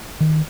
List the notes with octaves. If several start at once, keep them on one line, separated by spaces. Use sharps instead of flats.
D#3